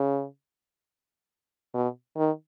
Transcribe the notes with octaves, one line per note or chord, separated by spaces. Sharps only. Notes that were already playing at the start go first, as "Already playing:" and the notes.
Already playing: C#3
B2
D#3